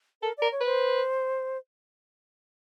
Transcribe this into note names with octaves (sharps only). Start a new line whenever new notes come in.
A4 A#4
A#4 D5
C#5
B4 C5